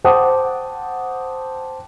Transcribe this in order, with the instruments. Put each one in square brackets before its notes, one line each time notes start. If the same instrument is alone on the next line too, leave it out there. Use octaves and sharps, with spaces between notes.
[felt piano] C5 F#5 G5 A5 D6 D#6